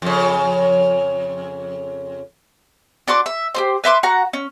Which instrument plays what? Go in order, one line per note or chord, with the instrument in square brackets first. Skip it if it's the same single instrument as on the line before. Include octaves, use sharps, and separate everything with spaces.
[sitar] F2 C#3
[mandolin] D4 F#4 C6 D6
E5
G4 G#4 C5
B4 E5 C6 D6
F#4 F#5 A#5
C#4